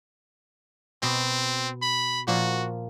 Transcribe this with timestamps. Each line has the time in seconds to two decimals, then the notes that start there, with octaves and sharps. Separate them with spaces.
1.03 B2 C4
1.82 B5
2.27 A#2 F3 A#3 F#4